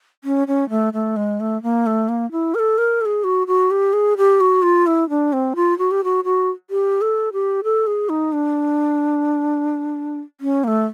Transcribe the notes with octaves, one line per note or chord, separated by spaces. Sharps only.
C#4
C#4
A3
A3
G#3
A3
A#3
A3
A#3
E4
A#4
A4
A#4
A4
G#4
F#4
F#4
G4
G#4
G4
F#4
F4
E4
D4
C4
F4
F#4
G4
F#4
F#4
G4
A4
G4
A4
G#4
D#4
D4
C#4
A#3
A3